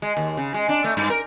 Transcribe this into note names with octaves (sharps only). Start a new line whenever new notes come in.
G#3
D#2
C#3
G#3
D4
A3
G2
A#4